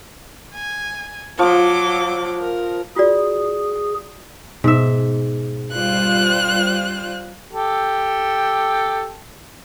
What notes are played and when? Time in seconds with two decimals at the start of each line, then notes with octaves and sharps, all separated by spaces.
0.54 G#5
1.39 F3 F#3 D6
2.40 A#4
2.96 F4 F#4 G#4 D5
4.64 G#2 B2 E5
5.72 G3 F4 C5 F#6
7.53 G4 A4